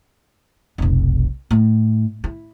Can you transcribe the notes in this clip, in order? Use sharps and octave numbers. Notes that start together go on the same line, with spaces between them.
F1 B1
A2
E4